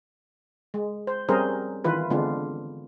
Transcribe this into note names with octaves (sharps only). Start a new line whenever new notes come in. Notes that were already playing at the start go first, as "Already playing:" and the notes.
G#3
C5
G3 C4 C#4 G#4 A#4 C5
D#3 E3 F4 B4
D3 G#3 B3 C4 D4 F4